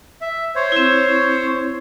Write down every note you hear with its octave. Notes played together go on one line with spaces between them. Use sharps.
E5
C5 C#5
C4 E4